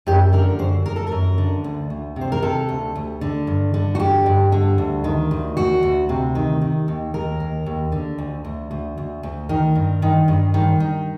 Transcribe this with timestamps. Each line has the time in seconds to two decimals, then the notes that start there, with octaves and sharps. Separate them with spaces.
0.07 F#2 G4
0.33 D3 A#4
0.59 F#2 C5
0.85 F#2 A#4
0.96 A4
1.07 F#2 A#4
1.38 D3
1.64 D2
1.90 D2
2.16 C3
2.21 C5
2.32 A#4
2.42 C3 A4
2.69 D2
2.96 D2
3.21 D3
3.47 G2
3.74 D3
3.95 F#4
3.99 G2 G4
4.26 G2
4.52 D3
4.78 D2
5.04 D#3
5.31 D2
5.57 D2 F#4
5.83 D2
6.09 C3
6.35 D#3
6.61 D#3
6.88 D#2
7.14 D#2 A#4
7.40 D#2
7.66 D#2
7.92 D3
8.18 D2
8.45 D2
8.71 D2
8.98 D2
9.23 D2
9.49 D#3 A#4
9.75 G2
10.02 D#3
10.28 G2
10.54 D#3
10.80 D#3